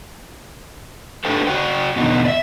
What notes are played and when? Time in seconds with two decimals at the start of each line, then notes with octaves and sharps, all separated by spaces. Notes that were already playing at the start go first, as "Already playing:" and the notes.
1.25 D4 G4 A4 B4 C5 G5
1.47 F#4 C#5 G5
1.96 E2 B2 D3 D#4
2.25 D5 E5